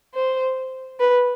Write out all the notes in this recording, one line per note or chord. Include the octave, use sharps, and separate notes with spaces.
C5
B4